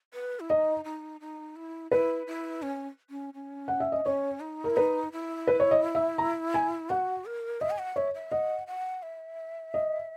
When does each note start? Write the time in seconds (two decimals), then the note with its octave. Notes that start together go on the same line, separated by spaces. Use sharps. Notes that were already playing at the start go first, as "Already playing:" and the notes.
0.14 B4
0.40 E4
0.50 D#4 D#5
0.85 D#4
1.21 D#4
1.56 E4
1.92 E4 B4
2.27 E4
2.62 C#4
3.10 C#4
3.34 C#4
3.68 F#5
3.80 E5
3.92 D#5
4.05 C#4 C#5
4.40 D#4
4.64 A#4
4.70 E4
4.77 D#4 B4
5.12 E4
5.47 B4
5.60 C#5
5.71 D#5
5.95 E5
6.18 A#5
6.54 G#5
6.90 F#4 F#5
7.26 A#4
7.61 D#5 E5
7.70 G#5
7.79 F#5
7.96 C#5 E5
8.14 E5
8.32 D#5 F#5
8.67 F#5
9.03 E5
9.74 D#5